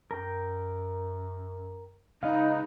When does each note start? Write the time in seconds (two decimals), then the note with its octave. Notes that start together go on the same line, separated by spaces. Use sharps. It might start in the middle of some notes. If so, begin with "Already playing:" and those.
0.11 F#2 A#4 G5
2.23 C#3 G#3 D#4 B4 D#5 F5